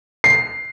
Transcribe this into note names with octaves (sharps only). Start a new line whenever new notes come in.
C7